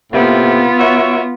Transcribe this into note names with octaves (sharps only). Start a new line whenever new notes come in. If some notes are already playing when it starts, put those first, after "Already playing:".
A2 C3 A#3 B3 F4
F#4 C#5 E5